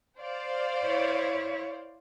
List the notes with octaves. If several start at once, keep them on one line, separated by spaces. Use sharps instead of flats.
C5 D5 F5
E4 C#5